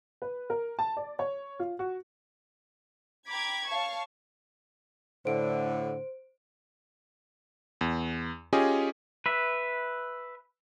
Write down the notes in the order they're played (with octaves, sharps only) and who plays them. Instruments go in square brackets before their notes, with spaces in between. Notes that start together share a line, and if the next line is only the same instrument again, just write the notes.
[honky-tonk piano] B4
A#4
A5
D5
C#5
F4
F#4
[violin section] G5 A#5 B5 D6 G#6
C#5 F5 A5 C#6
[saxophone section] A2 D3 [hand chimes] C5 D7
[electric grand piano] E2
C#4 F4 G4 G#4 D#5 G#5
[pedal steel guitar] B4 E5